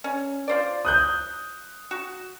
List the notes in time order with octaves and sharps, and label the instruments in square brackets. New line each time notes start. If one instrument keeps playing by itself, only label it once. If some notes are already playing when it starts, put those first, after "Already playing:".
[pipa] C#4
F4 C5 D5
[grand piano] D#6 F#6 G6
[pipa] F#4